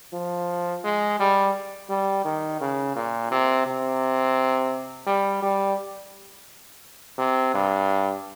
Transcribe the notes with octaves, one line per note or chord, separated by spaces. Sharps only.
F3
G#3
G3
G3
D#3
C#3
A#2
C3
C3
G3
G3
C3
G2